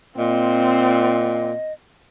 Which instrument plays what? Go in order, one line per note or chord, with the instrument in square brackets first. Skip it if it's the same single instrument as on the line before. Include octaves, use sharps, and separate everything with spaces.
[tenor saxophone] A#2 [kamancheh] C4 [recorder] D#5